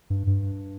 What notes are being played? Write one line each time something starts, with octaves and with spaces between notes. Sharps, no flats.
G2
G2